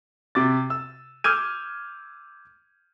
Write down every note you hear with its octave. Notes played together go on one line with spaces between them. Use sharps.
C3 D6 A6
E6
D6 E6 F6 G6 G#6 D#7